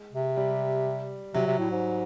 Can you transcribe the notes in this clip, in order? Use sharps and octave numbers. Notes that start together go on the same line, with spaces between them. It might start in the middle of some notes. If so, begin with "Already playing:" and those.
Already playing: G#3
C3
G3
C3 F#3
C3
A2
G#2